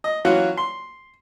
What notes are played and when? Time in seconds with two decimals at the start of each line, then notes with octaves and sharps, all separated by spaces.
0.04 D#5
0.25 E3 F#3 C#4 F4 F#4
0.57 C6